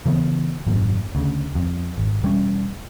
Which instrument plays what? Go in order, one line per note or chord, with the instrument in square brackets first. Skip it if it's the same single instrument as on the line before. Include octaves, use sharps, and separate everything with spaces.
[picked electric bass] C#3 E3 G#3 B3
G#1 F#2 A#2
D2 C#3
F2
G#1
E1 G3 C#4